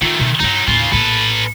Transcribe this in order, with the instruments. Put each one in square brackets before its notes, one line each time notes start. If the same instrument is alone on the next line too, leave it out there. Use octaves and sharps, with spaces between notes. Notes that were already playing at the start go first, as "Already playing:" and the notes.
[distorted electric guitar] D#3 A3 [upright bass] F4
[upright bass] B2
[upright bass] G2 D4 [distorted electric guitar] F#3 D#4
[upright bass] D#2 A2 [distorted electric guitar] C#3 F4
[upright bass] A#1 A2 [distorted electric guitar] A4 B4